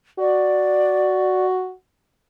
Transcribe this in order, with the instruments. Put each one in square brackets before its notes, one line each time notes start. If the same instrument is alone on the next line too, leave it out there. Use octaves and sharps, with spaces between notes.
[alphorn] F#4 [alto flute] D5